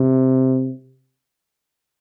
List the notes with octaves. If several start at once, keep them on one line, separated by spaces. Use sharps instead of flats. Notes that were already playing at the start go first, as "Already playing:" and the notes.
Already playing: C3